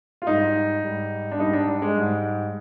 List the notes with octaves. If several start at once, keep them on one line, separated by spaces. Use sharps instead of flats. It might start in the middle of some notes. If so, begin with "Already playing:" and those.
F4
G#2 G3 D#4
G#2 G3
D4
G#2 G3 D#4
D4
D4
G#3
G#2 G3